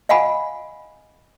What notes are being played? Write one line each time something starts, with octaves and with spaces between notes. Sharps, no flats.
D#5 F5 F#5 G#5 B5